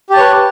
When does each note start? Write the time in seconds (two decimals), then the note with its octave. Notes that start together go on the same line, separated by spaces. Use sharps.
0.10 G4
0.13 A5
0.17 C#5
0.20 B4